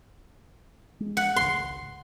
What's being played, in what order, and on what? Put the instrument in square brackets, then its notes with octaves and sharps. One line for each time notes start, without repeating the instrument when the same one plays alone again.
[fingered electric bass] G#3
[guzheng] F#5
[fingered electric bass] G#1 C#2 [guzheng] C6